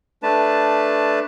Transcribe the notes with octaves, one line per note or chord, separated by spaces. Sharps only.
A3 D4 B4 A5